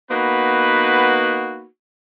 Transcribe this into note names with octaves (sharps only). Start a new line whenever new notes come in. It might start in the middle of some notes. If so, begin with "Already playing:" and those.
A#3 B3 D#4 F#4 B4